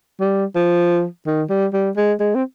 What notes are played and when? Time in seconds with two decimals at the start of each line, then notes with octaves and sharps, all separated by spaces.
0.20 G3
0.55 F3
1.26 D#3
1.49 G3
1.73 G3
1.97 G#3
2.20 G#3
2.35 C4